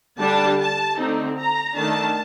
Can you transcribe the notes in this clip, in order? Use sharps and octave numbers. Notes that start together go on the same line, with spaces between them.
D3 G3 D4 A5
A5
D3 A3 C4 D#4
A#5
D#3 A3 D4 A5